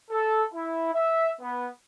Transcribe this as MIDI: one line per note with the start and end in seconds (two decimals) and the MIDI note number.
0.11 0.44 69
0.54 0.92 64
0.94 1.30 76
1.41 1.68 59